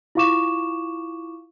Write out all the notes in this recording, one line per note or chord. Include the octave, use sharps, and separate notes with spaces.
E4 F4 F5 C#6 D6 E7